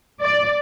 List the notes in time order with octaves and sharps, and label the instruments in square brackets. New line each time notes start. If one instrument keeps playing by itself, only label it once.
[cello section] D5